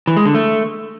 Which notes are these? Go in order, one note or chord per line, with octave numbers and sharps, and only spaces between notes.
E3
G#3
D3
A3